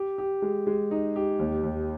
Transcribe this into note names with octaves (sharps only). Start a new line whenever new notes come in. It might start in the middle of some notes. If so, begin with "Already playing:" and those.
Already playing: G4
G4
G#3
G#3
D#4
G4
D#2
D#2